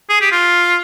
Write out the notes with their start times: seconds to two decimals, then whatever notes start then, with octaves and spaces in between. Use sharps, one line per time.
0.10 G#4
0.21 G4
0.32 F4